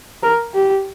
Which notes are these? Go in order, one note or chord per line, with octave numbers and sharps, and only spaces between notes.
A#4
G4